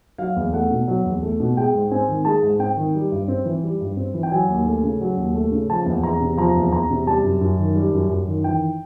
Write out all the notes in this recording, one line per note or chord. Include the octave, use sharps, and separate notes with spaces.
F#3 F5
E2
A3 F#5
B2
F#3
E2
A3
B2
G#3 G5
G#2
C4 G#5
D#3
G#3 A5
G#2
C4 G5
D#3
G3
G2
C4
E3
G3
G2
C4
E3
G5
F#3 G#5
D#2
A3
C#3
F#3
D#2
A3
C#3
F3 A5
E2
E2 A#5
C3
F3 A#5
E2
E2 A#5
C3
G3 A5
F#2
F#2
D#3
G3
F#2
F#2
D#3
E3 G5